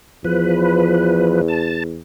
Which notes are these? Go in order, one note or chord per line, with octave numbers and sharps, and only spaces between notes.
E2 F3 B4
A5